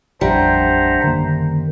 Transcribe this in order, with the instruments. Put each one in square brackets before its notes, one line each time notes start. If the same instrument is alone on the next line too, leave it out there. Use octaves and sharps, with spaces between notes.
[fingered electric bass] A1 F2 [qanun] G3 [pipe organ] D4 E5 F#5 [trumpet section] C5 A#5
[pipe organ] F#2 D#3 [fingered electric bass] D3 A#3